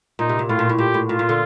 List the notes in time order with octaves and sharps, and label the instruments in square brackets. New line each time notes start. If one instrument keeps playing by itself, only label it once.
[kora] A#2 [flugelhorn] D#4
[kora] C3
A#2
[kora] A2 [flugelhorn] F4
[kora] A#2
A2
[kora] A#2 [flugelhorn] G4
[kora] A2
[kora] A#2 [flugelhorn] F4
[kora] A#2
D3